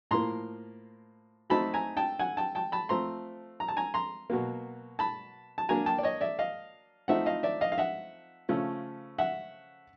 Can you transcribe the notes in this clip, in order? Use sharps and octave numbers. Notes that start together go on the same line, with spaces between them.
A2 F3 A#3 A#5 C6
F#3 A3 C4 D#4 A5 B5
G#5 A#5
G5 A5
F#5 G#5
G5 A5
G5 A5
A5 B5
F3 A3 C4 A#5 C6
A#5
A5
G#5 A#5
A#5 C6
B2 F#3 A#3
A5 B5
A5
F#3 A#3 D4 G#5 A#5
G5 A5
D5
C#5 D#5
D5 E5
D#5 F5
F3 A3 C4 D#4 E5 F#5
D#5 F5
D5 E5
D#5 F5
F5
E5 F#5
C#3 F3 A3 C#4
E5 F#5